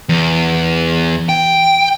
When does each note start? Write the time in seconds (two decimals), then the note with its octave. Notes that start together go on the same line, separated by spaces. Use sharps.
0.09 E2
1.29 G5